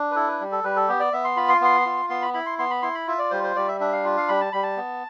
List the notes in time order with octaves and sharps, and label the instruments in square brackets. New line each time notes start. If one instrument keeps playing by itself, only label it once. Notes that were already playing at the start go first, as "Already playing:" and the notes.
Already playing: [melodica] D4
B4
E4 A4
B4
G3
A4
G3 B4
A4
B3 G4
D5
B3 E5
C6
F4 B5
C6
B3 C6
F4
B3 C6
B5
E4 B5
C6
B3 C6
B5
E4 C6
B5
F4 E5
D5
G3 C5
C5
G3 D5
E5
D4 E5
F5
F4
F5
G3 B5
A5
G3 B5
A5
B3